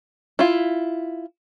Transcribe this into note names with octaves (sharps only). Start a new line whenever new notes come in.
E4 F4